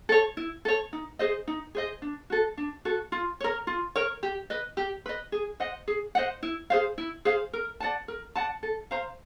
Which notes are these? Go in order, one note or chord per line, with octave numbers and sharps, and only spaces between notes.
A4 C#5
E4
A4 C#5
D#4
G#4 C5 D#5
D#4
G#4 C5 D#5
D4
F#4 A4
D4
F#4 A4
F4
A#4 C#5
F4
A#4 C#5
G4
B4 D#5
G4
B4 D#5
G#4
C5 D#5 F#5
G#4
C5 D#5 F#5
E4
G#4 C5 F5
E4
G#4 C5 F5
A#4
D5 F#5 A5
A#4
D5 F#5 A5
A4
C5 F5 A#5